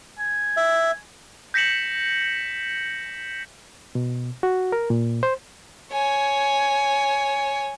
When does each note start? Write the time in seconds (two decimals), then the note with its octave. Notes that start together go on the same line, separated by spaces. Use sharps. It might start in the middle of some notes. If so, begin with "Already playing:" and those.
0.18 G#5
0.57 E5
1.54 G6 A#6 B6 C#7 E7 F#7
3.95 B2
4.43 F#4
4.72 A#4
4.90 A#2
5.23 C5
5.93 C#5 G#5